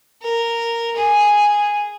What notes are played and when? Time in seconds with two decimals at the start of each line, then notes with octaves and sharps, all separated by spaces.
0.22 A#4
0.97 G#4